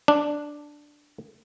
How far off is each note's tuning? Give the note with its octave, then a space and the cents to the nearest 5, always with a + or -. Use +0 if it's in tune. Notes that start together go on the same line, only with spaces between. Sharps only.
D4 +0